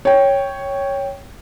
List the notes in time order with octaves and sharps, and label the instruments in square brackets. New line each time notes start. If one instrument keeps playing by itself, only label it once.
[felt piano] C#5 G5